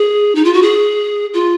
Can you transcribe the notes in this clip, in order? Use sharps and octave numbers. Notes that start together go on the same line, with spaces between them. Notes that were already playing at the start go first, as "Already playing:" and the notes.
Already playing: G#4
D#4
F4
F#4
G#4
F4